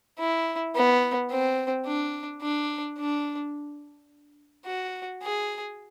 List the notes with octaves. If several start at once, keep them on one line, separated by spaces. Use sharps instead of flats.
E4
B3
C4
D4
D4
D4
F#4
G#4